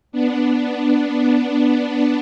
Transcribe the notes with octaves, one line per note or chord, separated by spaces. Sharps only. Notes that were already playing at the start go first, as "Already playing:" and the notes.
B3 D4